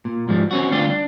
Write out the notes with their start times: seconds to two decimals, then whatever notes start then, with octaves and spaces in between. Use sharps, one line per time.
0.05 A#2
0.27 G#2 F3 G3
0.51 C4 C#4 F#4
0.72 D2 G3 D4 F4 G4
0.90 D4